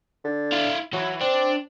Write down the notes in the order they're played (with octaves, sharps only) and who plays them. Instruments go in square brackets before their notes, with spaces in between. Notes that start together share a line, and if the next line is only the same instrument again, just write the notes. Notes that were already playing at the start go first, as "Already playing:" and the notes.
[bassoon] D3
[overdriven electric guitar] E4 F5
[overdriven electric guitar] E3 [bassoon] F#3
[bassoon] C4 [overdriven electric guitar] D4